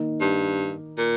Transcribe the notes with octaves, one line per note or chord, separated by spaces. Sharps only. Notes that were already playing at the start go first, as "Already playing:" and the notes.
Already playing: D#3 A#3 D#4
G2
A#2